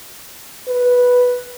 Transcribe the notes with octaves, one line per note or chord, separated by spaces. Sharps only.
B4